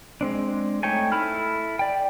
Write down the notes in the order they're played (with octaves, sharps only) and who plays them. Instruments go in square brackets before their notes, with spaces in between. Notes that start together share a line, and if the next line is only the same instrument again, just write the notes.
[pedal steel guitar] G#3 C4 D4
A3 D#4 C#5 G5 G#5
E4 A4 B5 F6
D5 G5